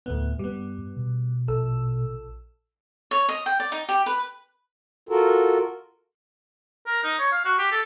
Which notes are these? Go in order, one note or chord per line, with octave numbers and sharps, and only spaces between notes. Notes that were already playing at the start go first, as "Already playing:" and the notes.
D2 A2 B3
G2 G3 B3
B2
A#1 A4 E6
C#5
D#5
G5
D5
D#4
G4
B4
F4 F#4 A4 A#4
A#4
D#4
C#5
F5
F#4
G4
A4